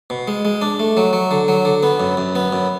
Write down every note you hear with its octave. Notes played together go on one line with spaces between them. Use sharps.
B2
G#3
G#3
D4
A3
F#3
F#3
D3
F#3
D3
B3
F#2
F#2
B3
F#2